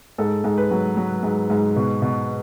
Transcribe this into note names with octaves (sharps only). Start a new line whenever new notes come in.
G#2 A4
G#2
B4
F#3
F#3
G#2
G#2
B2
B2